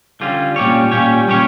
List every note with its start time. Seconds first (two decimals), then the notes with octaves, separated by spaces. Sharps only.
0.21 D3 G3 C#4 F4
0.56 A#2 G3 C#4 G4 C#5
0.91 A#2 G3 C#4 G4 C#5
1.27 A#2 G3 C#4 G4 C#5